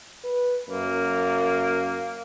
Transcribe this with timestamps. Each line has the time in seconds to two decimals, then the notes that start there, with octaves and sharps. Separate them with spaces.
0.24 B4
0.70 F#2 A#3